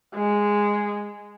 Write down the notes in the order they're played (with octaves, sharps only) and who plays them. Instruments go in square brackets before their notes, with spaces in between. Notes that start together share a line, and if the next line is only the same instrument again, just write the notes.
[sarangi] G#3